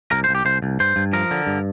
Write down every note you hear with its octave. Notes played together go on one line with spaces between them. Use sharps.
C2 A#4
C5
C2
G4
C2 C5
C2
G2 C5
G2
F3 A#4
D3
G2